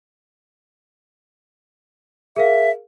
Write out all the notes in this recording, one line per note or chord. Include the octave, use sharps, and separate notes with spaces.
G#4 A#4 E5 F5